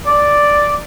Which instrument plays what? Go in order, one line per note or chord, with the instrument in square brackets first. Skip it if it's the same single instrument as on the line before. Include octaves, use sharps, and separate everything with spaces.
[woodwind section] D5